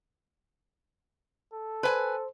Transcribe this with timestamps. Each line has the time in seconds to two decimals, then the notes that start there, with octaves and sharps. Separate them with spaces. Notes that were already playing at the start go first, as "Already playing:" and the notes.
1.53 A4
1.83 B4 C5 G#5